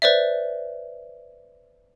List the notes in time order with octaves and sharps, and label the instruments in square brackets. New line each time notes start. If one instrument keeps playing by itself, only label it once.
[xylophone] B4 C5 D5 E5